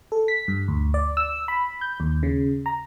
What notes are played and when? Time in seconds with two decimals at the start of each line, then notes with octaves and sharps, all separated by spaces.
0.12 A4
0.28 B6
0.48 G2
0.68 D2
0.94 D5
1.17 E6
1.48 B5
1.81 G6
2.00 D#2
2.23 C#3
2.66 A#5